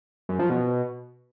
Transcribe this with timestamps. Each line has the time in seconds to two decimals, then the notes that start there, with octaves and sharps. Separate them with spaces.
0.29 F#2
0.39 F3
0.50 B2